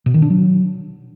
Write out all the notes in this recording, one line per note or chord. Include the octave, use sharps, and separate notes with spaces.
B2
D#3
D4
F#3